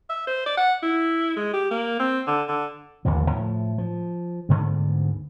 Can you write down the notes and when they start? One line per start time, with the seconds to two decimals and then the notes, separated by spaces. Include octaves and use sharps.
0.09 E5
0.27 C5
0.46 D5
0.57 F#5
0.82 E4
1.36 G#3
1.53 G4
1.71 A#3
1.99 C4
2.27 D3
2.48 D3
3.05 A1 D#2 D3 F3
3.30 A2 F3
3.78 F3
4.49 D2 G#2 D3 B3